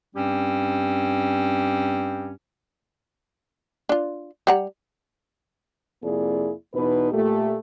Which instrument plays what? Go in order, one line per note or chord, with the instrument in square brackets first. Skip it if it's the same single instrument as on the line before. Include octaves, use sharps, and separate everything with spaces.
[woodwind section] G2 G3 C4 C#4 G4
[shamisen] D4 F4
G3 F#5 A#5
[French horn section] F2 C3 A#3 E4 G#4 D5
E2 B2 D#4 B4
A#2 A3 G4